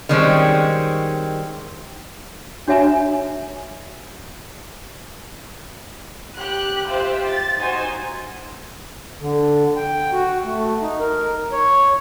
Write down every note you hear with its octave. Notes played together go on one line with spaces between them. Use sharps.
D#3 G3 G#3 C4 C#4
D4 F#4 C#5 E5 G#5 A#5
G4 F#6
F4 G4 C5 E5
A6
D#4 F#4 C5 G#5
D3
G5
F#4
A3
D#4
A#4
C#5